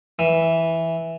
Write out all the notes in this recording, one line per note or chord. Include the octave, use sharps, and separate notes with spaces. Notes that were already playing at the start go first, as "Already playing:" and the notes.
E3